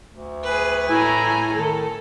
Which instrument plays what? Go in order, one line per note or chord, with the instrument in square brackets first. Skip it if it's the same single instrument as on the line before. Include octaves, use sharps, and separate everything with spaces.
[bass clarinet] D2
[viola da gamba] G#4 B4
[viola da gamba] A2 [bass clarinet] E4 [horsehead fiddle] G#5 A#5
[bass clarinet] D#3 [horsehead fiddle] A4